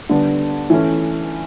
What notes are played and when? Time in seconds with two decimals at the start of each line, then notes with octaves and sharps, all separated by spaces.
0.09 D3 G3 B3 D4
0.70 E3 A3 C#4